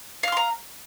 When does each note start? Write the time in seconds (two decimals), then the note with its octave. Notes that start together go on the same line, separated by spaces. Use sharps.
0.23 F5
0.28 F6
0.32 C6
0.37 A#5